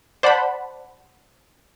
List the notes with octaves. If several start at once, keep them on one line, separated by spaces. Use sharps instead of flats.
C5 D5 F#5 A5 B5